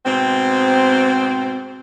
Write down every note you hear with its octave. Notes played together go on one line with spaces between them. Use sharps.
G#2 B2 C4